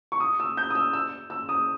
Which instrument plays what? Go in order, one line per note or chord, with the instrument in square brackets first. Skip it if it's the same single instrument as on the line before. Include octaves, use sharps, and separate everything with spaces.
[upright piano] C#6
D#6
E6
G6
D#6
E6
E6
E6
D#6